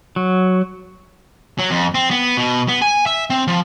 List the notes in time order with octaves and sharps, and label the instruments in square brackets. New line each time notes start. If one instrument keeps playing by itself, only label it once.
[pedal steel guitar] F#3
[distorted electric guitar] F#3
F2
C4
B3
B2
B3
G#5
E5
C4
F3